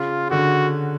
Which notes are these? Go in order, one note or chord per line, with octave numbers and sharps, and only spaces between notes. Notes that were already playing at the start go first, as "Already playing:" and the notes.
Already playing: C#3 F4
D3 F#4